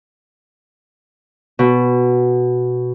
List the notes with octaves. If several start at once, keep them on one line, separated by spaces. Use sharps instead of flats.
B2